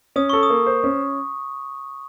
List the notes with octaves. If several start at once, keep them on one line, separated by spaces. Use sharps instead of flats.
C#4 D#6
A4 C#6
D#6
A#3
C5
C#4